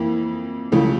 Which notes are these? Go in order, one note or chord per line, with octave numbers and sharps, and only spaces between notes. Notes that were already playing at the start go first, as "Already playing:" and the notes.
Already playing: F2 E3 A#3 E4
C#2 C#3 F3 A3